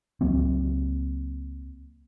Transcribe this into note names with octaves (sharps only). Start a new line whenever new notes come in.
C#2 F#3 A#3 C4